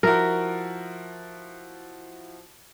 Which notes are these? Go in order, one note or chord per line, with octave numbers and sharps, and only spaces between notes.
F3 E4 F#4 A#4